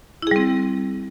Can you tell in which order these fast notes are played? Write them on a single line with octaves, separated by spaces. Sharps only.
E4 G#4 G3 C4